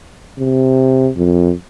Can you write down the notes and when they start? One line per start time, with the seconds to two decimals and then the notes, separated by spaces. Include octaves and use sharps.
0.39 C3
1.17 F2